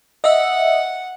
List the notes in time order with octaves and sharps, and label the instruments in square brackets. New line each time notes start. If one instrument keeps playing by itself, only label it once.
[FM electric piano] D#5 E5 [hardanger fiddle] F#5